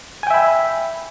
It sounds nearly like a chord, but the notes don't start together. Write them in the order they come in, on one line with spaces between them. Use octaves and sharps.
G#5 G5 E5 B5